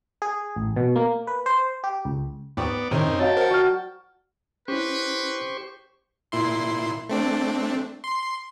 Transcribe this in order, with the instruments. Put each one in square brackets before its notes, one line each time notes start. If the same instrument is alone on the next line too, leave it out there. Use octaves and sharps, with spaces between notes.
[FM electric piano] G#4
A1
B2
A#3
B4
C5
G4
C#2
[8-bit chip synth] D#2 G#2 [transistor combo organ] B3 D5 [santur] G5 C#6 D#6
[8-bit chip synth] A2 C3 D#3 [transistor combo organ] C4 C#4 D#4 [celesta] A#5
[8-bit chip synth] F#2
[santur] F#3 [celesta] C#5 D#5 F5 [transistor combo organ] G5 A5
[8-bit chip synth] A#4 F#5 [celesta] C5
[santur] F#4 [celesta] D5 F6
[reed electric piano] C#4 E4 [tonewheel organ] G4 C5 C#6 [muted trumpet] B4
[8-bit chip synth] A#2 E4 C6
A3 C4 D4
C6